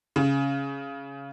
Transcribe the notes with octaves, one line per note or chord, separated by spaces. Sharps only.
C#3